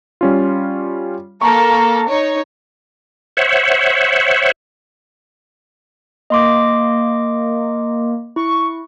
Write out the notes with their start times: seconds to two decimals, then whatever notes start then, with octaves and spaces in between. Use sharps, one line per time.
0.21 G3 C#4 F4
1.41 A#3 A4 A#5 C#6
2.09 D#4 C#5
3.37 C5 C#5 E5 F#5
6.30 A#3 D#5 C6 D6
8.36 E4 C#6